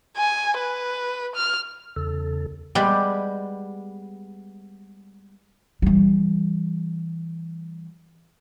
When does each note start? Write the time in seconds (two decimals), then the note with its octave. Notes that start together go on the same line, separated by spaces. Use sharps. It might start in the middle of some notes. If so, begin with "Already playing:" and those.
0.18 G#5
0.58 B4
1.35 F6
1.96 E2 C#3 A4
2.75 G3 G#3 B3 D5 G5
5.82 E3 G3